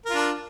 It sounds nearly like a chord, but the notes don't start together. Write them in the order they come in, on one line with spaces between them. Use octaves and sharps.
A#4 F4 D4